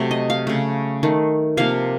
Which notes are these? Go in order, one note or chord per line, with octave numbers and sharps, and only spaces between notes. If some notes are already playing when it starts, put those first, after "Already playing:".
Already playing: C3 F#3 A3
D#5
F5
C#3 A3
D#3 A3
C3 F3 A#3 F5